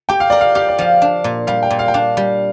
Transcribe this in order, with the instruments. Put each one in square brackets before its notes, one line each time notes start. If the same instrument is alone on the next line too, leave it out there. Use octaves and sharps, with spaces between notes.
[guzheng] G4 [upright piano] G5
[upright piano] F5
[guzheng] A#4 [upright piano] D5
[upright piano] F5
[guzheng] G4 [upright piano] F5
[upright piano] D5
[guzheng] F3 [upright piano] F5
[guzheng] D4
A#2
[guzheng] G3 [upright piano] F5
[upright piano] G5
[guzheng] A#2
[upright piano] F5
G5
[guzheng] D4 [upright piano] F5
[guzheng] G3